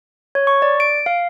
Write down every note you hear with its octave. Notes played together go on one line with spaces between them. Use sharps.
C#5
C#6
D5
D7
F5